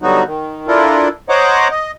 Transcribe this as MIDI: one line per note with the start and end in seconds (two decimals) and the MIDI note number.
0.02 0.23 50
0.02 0.23 54
0.02 0.23 55
0.02 0.23 59
0.02 0.23 63
0.02 0.23 66
0.27 0.67 51
0.68 1.08 62
0.68 1.08 64
0.68 1.08 65
0.68 1.08 69
0.68 1.08 70
1.29 1.68 72
1.29 1.68 73
1.29 1.68 75
1.29 1.68 78
1.29 1.68 82
1.29 1.68 86
1.71 1.91 75